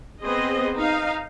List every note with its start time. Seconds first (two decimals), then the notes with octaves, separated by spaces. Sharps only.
0.22 B3 C4 G#4 C5 D#5
0.77 D#4 F5